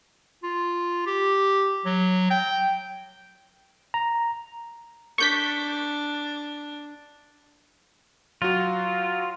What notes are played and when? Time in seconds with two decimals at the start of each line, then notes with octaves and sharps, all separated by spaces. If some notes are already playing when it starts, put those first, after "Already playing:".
0.43 F4
1.07 G4
1.85 F#3
2.30 G5
3.94 A#5
5.18 D4 C#6 G6 B6
8.42 F#3 F4 F#4